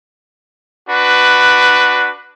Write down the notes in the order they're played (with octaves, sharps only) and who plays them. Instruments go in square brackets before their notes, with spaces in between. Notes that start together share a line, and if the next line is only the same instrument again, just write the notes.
[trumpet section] D4 F#4 B4